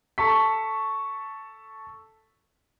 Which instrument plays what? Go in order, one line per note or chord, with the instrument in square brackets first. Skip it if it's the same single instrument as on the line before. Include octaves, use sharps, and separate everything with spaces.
[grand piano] A4 A5 C#6 B6